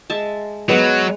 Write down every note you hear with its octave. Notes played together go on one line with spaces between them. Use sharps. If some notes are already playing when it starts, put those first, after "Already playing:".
G#3 E5 A5
F#3 G#3 B3 B4 F#5